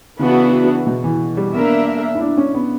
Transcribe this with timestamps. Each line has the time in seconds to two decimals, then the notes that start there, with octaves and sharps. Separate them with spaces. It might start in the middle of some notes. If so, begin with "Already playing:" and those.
0.19 C#3 E3 B3 D4 F#4
0.87 B2
1.04 E3
1.37 G3
1.54 A#3 B3 D4 A#4 E5
2.15 E4
2.21 D4
2.37 C#4
2.55 B3